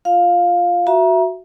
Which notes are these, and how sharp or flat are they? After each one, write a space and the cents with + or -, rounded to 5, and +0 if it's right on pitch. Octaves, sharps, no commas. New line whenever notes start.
F4 +0 F5 +10
F#4 +0 E5 +15 A#5 +30